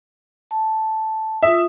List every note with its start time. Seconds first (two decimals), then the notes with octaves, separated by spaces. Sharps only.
0.51 A5
1.42 F4 E5 D#6